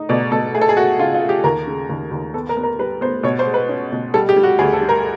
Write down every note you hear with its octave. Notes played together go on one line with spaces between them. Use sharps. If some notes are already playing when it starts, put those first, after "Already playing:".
Already playing: D#4
B2 D5
B2 A4
A3 G#4
A4
G#4
A3 F#4
C#3 F4
F4
A3
G4
D#2 A#4
C#3
D#2
D#2
B3 A4
A#4
B3
A#4
G3 B4
B3 C5
B2 C#5
C5
G#3
B4
C#4
B2
G3 A4
G4
G3
F#4
D2 G#4
A4
G3
A#4